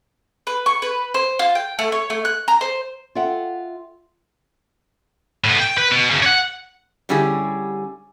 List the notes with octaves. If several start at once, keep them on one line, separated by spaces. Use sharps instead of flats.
B4
C#6
B4
C5
F4
G5
A3
C#5
A3
F#6
A#5
C5
F4 A4 E5 F#5 G5
A2 B3
G5
B4
B2
F#2 C#3
C#5 F#5
D3 G3 C#4 E4 G4 G#4